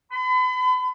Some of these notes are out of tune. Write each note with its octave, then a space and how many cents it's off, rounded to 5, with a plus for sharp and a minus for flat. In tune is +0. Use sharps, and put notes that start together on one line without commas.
B5 +40